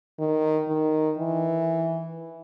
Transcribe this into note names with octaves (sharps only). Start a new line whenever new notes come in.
D#3
D#3
E3